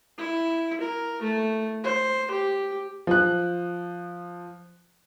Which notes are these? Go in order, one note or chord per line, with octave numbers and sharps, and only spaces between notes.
E4
A#4
A3
C5
G4
F3 F#6